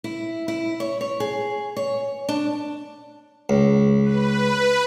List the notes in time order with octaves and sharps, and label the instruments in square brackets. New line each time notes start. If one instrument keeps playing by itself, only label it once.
[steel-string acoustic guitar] E4
E4
C#5
C#5
G#4
C#5
D4
[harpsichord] C#2
[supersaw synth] B4